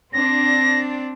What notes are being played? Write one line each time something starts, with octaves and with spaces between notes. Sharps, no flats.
C4 D4 A#6